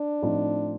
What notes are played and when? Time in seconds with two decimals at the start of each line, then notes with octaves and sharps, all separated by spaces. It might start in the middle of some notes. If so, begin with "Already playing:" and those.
Already playing: D4
0.22 A2 F3 A3 C4 D#4